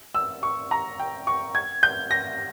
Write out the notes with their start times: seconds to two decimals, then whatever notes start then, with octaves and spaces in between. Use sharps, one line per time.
0.15 E6
0.43 C#6
0.71 A#5
1.00 G5
1.27 C#6
1.55 G#6
1.83 G6
2.11 A#6